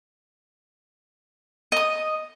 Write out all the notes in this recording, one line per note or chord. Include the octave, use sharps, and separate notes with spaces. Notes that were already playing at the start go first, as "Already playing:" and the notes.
D#5 D#6